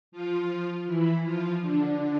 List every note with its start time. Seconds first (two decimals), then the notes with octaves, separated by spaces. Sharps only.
0.12 F3 F4
0.87 E3 E4
1.24 F3 F4
1.62 D3 D4